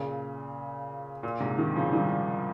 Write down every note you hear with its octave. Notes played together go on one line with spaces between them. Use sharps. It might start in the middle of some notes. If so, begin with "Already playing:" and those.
Already playing: A#2 C#3
A#2
G#2 C3
C3 D#3
C#3 F3
D#3 G3